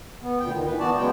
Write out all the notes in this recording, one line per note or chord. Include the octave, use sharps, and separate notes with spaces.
B3
D2 A#2 G5
D#3
E3 B4
B3 F#4 D5 A5
C#3 F#3 G#3 B3 G5